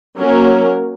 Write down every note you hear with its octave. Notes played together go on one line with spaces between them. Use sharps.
F#3 A#3 C#4 A#4